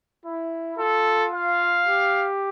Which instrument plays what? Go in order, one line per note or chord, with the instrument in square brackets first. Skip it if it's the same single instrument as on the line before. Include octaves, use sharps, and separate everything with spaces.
[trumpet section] E4
[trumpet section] F4 [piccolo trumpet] A4
[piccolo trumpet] F5
[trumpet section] G4